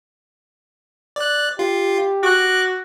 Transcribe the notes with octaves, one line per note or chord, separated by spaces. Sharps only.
D5 F#6
F4 G4
F#4 D6 F#6